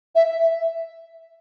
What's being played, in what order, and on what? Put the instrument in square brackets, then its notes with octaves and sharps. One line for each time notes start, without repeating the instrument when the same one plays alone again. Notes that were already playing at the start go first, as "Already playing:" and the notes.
[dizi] E5